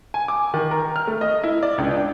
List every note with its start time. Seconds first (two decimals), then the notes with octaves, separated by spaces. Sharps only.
0.14 G#5
0.28 D6
0.54 D#3
0.71 A#4
0.96 F6
1.07 A3
1.21 D#5
1.44 E4
1.63 D5
1.78 C#2
1.91 D4